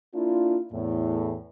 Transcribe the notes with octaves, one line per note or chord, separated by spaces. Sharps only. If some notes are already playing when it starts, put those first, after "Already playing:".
A#3 D4 E4 F4
E2 A2